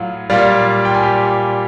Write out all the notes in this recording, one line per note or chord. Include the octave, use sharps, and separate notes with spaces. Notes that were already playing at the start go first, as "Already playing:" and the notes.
Already playing: A2 F#3 F4
A#2 G3 F4 F5
G5
G#5
G4 G5